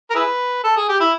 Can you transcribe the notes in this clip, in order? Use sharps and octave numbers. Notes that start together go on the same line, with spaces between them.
A#4
E4 G#4 B4
A4
G#4
G4
E4